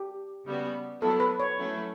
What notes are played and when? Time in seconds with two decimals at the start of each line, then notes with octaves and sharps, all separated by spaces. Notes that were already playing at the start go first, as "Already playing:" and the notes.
Already playing: G4
0.45 C#3 G3 B3 F#4
1.01 F#3 B3 E4 A4
1.20 B4
1.40 C#5
1.58 F#3 A3 C#4 E4